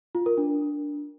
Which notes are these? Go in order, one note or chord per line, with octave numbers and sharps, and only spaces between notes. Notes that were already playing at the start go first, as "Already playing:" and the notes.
F4
A#4
D4